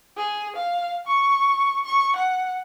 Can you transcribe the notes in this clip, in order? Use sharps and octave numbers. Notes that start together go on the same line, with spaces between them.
G#4
F5
C#6
C#6
F#5